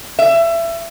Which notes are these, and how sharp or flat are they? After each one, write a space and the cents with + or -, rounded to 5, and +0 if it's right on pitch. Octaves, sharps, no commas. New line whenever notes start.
E5 +25